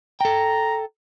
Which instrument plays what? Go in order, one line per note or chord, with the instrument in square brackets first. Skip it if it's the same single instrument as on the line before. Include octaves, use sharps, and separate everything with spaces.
[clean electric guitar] A4 G5 [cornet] A#5